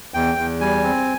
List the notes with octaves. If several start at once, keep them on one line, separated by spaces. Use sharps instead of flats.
E2 G5
E2
G3 G#5
C4